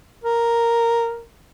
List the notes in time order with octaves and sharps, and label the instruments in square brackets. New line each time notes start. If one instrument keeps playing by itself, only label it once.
[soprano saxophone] A#4